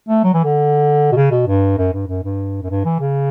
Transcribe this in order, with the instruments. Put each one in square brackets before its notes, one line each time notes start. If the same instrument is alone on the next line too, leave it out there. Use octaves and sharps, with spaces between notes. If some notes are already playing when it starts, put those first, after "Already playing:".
[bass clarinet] A3
F#3
E3
D3
B2
C#3
B2
G2
F#2
G2
F#2
G2
F#2
G2
E3
C#3